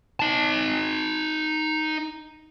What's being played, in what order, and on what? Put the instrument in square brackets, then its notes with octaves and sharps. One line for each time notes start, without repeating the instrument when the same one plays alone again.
[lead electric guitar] D#4 A5